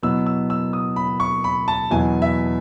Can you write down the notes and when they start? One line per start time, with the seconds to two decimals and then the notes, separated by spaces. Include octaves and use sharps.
0.03 B2 F#3 B3 E4 E6
0.26 E6
0.50 E6
0.73 D#6
0.96 B5
1.20 C#6
1.44 B5
1.68 A5
1.91 E2 B2 F#3 B3 E4 G#5
2.22 E5